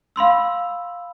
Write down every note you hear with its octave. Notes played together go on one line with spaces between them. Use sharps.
F5 B5 C6 E6